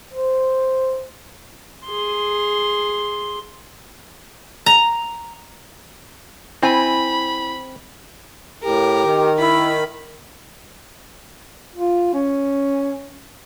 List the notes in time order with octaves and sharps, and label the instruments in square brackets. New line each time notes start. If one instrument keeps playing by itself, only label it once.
[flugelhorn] C5
[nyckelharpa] G#4 C6
[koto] A#5
[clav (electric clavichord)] C4 [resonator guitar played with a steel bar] E4 G#5 [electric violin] B5
[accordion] A2 [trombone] G4 [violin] A#4
[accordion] D#3
[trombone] E4 [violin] B5
[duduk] F4
C#4